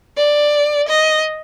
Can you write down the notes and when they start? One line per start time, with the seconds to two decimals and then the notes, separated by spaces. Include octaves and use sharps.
0.17 D5
0.88 D#5